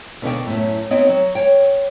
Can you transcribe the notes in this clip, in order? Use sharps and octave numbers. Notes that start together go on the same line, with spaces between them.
B2 D3 D#3 G5
F#2 A2
B3 C4 D#4 C#5 D#5 G5
F#3
C#5 G5